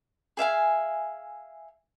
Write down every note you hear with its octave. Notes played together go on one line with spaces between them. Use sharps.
G#4 E5 F5 G#5